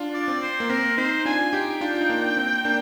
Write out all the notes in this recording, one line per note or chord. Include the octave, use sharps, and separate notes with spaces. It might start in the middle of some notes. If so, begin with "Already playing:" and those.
Already playing: D4 F4
D5
C4
C5
A#3
C4 A#4
C4 D#4 C5
D4 F4 G#5
D#4 G4 G5
D4 F4
D#4
A#3 D4
C4
A#3 D4